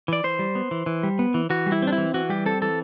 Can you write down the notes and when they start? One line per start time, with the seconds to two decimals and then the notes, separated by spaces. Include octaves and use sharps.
0.08 E3 D5
0.24 E3 C5
0.39 G3
0.55 B3
0.71 E3
0.86 E3
1.03 G3
1.19 B3
1.34 E3
1.50 E3 F#4
1.66 G3
1.72 E4
1.82 C4 D4
1.93 E4
1.98 E3
2.14 E3 F#4
2.29 G3 G4
2.46 C4 A4
2.62 E3 A4